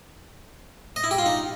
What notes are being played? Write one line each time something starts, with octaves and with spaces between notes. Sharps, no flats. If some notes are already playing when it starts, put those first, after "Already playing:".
D#5
E4
G4
F4
D#4